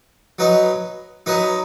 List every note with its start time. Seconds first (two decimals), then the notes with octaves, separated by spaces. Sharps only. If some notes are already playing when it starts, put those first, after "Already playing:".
0.39 F#3 D#4 B4 D#5
1.26 F#3 D#4 B4 D#5